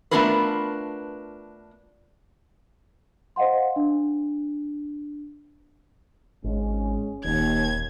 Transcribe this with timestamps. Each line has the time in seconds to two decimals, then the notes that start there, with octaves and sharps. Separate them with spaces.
0.11 A3 B3 D4 F4 A#4 B4
3.36 C5 D#5 F5 F#5 C6
3.76 D4
6.44 G#1 G#3 C#4
7.24 D#1 D#2 G#6